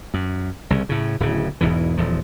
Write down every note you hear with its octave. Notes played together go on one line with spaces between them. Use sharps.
F#2
C2 C#3
A2 C#3
D1 A2 C#3
E1 E2 G#2 E3
D#1 E2 F3